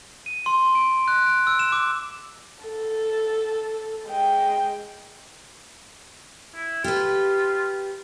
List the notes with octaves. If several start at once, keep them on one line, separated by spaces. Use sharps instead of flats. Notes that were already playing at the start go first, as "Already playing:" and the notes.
D#7
C6
D7
F#6
D7
E6
E7
D6
A4
G#3 G5
E4
F4 G4 B4